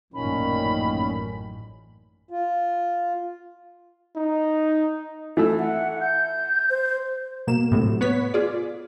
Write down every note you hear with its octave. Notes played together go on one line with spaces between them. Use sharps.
A1 F#2 A#2 D#3 C#4 B5
F4
D#4
E3 A3 A4 E6
E5 F#5
G6
C5
B2 A#3 E7
A2 C3 F#3 A3
B3 B4 C#5 B6
F4 G#4 D5